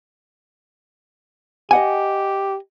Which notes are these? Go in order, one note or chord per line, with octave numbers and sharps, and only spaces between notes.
G4 D#5 F#5 G#5